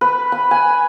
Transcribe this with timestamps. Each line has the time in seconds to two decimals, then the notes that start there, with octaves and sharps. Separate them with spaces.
0.01 B4
0.32 B5
0.51 G#5